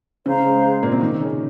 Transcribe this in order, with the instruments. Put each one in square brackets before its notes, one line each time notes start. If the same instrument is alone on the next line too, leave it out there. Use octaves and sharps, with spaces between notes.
[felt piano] C#3 C#4 [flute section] C5 F5 A#5
[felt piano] G#3
G#3
A#2 A#3
C3 C4
D#3 D#4
C#3 C#4